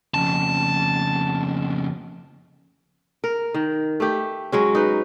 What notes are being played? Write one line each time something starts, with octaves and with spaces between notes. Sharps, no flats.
F2 C#3 A5
A#4
D#3
A3 G4
F#3 G#3 C#4
D#4 B4